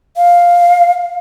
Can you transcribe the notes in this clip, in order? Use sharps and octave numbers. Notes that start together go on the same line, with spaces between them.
F5